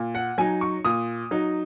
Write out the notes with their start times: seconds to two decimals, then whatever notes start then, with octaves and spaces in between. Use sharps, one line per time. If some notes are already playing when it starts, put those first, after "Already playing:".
Already playing: A#2
0.15 F#5
0.38 F#3 D#4 G#5
0.61 C#6
0.84 A#2 D#6
1.31 F#3 D#4